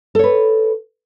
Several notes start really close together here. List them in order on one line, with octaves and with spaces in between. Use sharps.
A4 C#5 B4